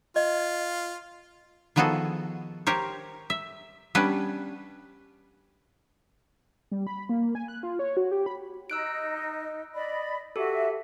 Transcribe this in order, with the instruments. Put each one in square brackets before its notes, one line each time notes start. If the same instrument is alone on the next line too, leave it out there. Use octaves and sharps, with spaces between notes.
[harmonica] F4 [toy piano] D#5
[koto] D#3 F3 B3 F#4 G#4 A4
G4 A#4 C5 C#5
E5
G3 B3 C#4 D4 B4
[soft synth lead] G3
B5
A#3
G#5
F#6
F4
C#5
F#4
G4
B5
[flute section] D#4 [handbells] E6 F#6 D7
[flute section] D5 D#5 B5
[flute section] F#4 E5 [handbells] G4 A4